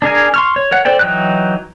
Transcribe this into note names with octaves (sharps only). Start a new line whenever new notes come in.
D4 G#4 A#4 G#5
C6 C#6 F6
C#5
A#4 C#5 F#5
A4 C5 D5 G5
E3 F#3 D#4 G5 F#6